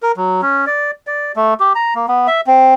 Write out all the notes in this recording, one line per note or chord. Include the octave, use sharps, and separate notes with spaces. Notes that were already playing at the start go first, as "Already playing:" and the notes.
A#4
F#3
C#4
D5
D5
A3
G4
A#5
A#3
B3
E5
C4